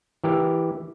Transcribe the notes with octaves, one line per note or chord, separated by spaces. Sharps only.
E3 G4 A#4